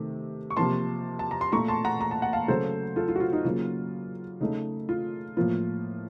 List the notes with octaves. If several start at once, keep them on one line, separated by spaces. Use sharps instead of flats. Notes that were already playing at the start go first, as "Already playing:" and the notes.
Already playing: C3 D#3 A3
C#6
C3 F3 A#3 A5 C6
A5
A#5
C6
A#2 A3 A#5 C#6
A5 C6
F#5 A#5
A#5
A5
F#5
F5 A5
C#3 F#3 A3 A4 C5
F4 A4
F4
F#4
F4
D#4
C#3 F#3 A#3 F4
C#3 A3 D#4
F4
A2 F3 A#3 F4